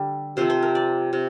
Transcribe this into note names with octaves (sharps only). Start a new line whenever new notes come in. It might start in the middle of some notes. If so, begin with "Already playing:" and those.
Already playing: D3 G3
C3 F3 A3 C5
C5
A#4
D5
C3